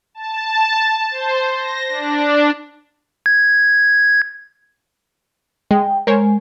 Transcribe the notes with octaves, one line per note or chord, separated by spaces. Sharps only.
A5
C5
A#6
D4
G#6
G#3 G5
G#3 A#4 C5 C#5 G#5